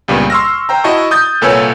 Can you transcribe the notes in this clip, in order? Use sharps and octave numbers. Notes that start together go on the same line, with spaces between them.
C#2 G2 A#2 G3 B3
C6 C#6 E6 F6 A#6
C5 G5 A#5
E4 F#4 D#5 F#5 A5 C#6
D#6 G6 A6
C2 A#2 A4 B4 C#5 G#5